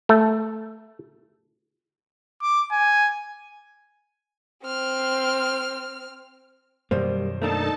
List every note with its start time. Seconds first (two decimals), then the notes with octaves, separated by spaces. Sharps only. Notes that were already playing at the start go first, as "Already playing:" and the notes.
0.09 A3
2.42 D6
2.71 G#5
4.63 C4 F6
6.91 F#2 B2 D#3 G3 A#3 C5
7.42 A3 A#3 D4 D#4 A4 A5